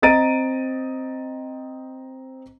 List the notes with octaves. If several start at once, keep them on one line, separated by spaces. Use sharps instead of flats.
C4 D#5 A#5 A6 D7 D#7